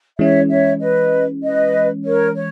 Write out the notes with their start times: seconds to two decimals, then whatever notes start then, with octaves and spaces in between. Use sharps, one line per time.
0.18 E3 G#3 C#4 C#5 E5
0.49 C#5 E5
0.80 B4 D#5
1.43 B4 D#5
2.05 A#4 C#5
2.35 C#5